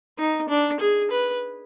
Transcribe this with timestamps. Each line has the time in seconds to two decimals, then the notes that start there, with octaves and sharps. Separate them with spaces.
0.18 D#4
0.49 D4
0.80 G#4
1.11 B4